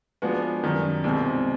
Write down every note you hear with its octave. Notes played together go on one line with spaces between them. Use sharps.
F3 G#3 B3 D4 F#4
F#2 D#3 G3
C2 B2 G#3 C4